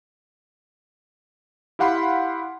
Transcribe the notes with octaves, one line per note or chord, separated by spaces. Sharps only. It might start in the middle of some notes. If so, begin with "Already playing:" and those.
E4 G4 F5 F#5 B5 C6